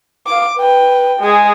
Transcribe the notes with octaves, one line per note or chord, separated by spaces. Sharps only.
F5 D6
B4 G5
G#3 G#4